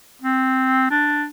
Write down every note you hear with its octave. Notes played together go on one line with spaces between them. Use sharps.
C4
D4